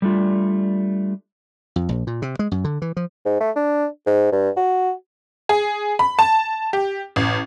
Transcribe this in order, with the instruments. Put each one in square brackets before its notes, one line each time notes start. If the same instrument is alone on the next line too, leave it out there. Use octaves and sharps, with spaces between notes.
[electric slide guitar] G3 A3 D4 F4
[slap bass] F2
A#1
A#2
C3
G#3
F#2
D3
E3
F3
[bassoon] G#2
A3
D4
G#2
G2
F#4
[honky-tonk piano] G#4
B5
A5
G4
A1